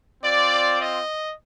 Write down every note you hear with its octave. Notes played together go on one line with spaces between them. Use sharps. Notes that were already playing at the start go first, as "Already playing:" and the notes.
C4 F4 D5
D#5